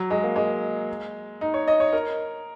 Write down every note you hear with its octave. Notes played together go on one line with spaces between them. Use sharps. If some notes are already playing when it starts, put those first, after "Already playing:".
Already playing: F#3
G#3
A#3
G#3
D#4
C#5
D#5
C#5
A#4